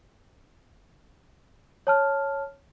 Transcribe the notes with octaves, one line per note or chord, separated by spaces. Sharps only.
C#5 A5 F6